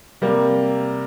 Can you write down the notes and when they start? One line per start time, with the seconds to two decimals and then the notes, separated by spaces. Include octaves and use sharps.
0.22 C3 G3 A#3